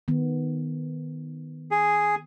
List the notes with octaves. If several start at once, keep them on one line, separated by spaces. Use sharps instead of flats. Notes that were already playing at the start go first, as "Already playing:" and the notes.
D#3 B3
G#4